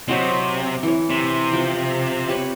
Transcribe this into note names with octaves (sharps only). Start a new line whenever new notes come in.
C3 F#3 C5 D#5
E3 C#5
C3
F3 G5 D6
G4 B4 C#5